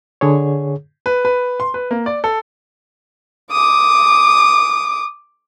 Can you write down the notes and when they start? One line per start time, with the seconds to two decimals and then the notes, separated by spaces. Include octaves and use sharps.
0.21 D3 G#4 C#5
1.06 B4
1.25 B4
1.60 C6
1.74 B4
1.91 A#3
2.06 D5
2.24 A4
3.52 D6 D#6